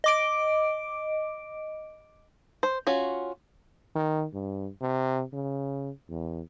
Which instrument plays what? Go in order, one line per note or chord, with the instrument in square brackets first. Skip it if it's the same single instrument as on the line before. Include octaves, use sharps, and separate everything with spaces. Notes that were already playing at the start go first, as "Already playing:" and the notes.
[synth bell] D#5 D6 D7
[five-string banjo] C5
C#4 F4 F#4
[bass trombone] D#3
G2
C3
C#3
E2